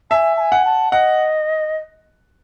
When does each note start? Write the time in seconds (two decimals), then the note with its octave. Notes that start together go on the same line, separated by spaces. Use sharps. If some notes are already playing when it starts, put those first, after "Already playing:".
0.10 E5 G#5 A5
0.37 A5
0.40 G#5
0.52 F#5
0.65 A5
0.92 D#5 F#5